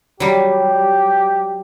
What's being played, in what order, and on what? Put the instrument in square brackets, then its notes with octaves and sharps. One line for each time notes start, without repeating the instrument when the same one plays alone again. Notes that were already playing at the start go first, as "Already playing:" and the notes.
[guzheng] F#3 G3 [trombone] G4